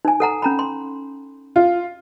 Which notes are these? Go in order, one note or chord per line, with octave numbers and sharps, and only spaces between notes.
D#4 G#5
A4 F#5 A#5
C#4 A#5 B5
C6
F4